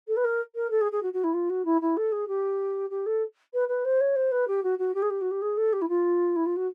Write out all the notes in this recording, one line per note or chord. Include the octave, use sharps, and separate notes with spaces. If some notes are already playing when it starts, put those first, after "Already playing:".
A4
B4
A#4
A#4
A4
G#4
G#4
F#4
F#4
E4
F4
F#4
E4
E4
A4
G#4
G4
G4
A4
B4
B4
C5
C#5
C5
B4
G4
F#4
F#4
G4
G#4
G4
F#4
G4
G#4
A4
G4
E4
F4
E4
F4
F#4